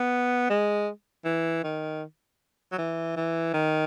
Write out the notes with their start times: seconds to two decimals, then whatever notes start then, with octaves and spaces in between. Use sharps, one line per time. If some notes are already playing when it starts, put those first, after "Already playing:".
Already playing: B3
0.49 G#3
1.25 E3
1.63 D#3
2.72 F#3
2.78 E3
3.16 E3
3.53 D#3